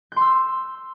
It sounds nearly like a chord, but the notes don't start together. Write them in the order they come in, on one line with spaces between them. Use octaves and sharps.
G6 C6 E6